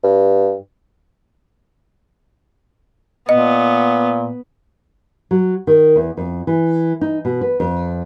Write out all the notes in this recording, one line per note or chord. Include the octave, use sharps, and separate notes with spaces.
G2
A#2 B3 D#5
F#3
D#3
E2
F2
E3
D#4
B2
B4
F2